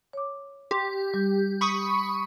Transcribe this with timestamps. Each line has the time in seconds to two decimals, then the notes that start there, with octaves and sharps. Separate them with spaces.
0.13 C#5 D6
0.71 G4 C6
1.14 G3
1.61 B5 C#6 D#6